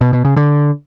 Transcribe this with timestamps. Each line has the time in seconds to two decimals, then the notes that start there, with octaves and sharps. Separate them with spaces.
0.01 B2
0.13 B2
0.25 C#3
0.36 D3